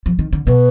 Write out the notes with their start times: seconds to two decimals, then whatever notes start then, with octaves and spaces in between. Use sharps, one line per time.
0.06 F3
0.19 D#3
0.33 D3
0.47 B2 B4